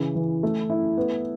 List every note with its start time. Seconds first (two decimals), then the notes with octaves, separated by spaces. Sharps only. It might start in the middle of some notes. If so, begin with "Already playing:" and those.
Already playing: C#3 E3
0.15 E3
0.43 A3
0.70 E4
0.97 B3